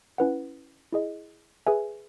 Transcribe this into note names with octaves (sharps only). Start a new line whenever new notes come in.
C#4 E4 B4 F#5
E4 G#4 D#5
G#4 B4 E5 G#5